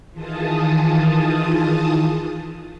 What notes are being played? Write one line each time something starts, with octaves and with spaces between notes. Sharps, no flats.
D#3 E3 F4 G#4 A5 D#6